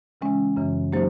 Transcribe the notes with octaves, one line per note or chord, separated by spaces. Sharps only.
C#3 E3 G#3 C#4
F#2 C#3 E3
F#3 A#3 D#4 G4 C5